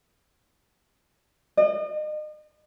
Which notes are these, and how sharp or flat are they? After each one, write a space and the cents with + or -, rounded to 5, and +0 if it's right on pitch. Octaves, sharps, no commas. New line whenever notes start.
D#5 -40